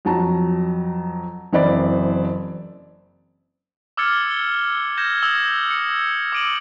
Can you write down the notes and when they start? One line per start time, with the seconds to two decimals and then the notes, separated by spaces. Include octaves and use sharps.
0.05 F2 F#3 A5 A#5
1.53 F#1 E3 C4 C5 D5 B5
3.97 D6 E6 F6 G#6 A6 C#7
4.30 G7
4.97 G6 G#6 A#6 E7
5.22 D#6 E6 G#6 G7
5.71 C#7
6.32 D6 E6 D7 D#7 F#7